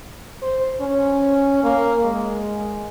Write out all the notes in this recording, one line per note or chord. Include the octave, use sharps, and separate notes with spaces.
C5
C#4
A#3
G#3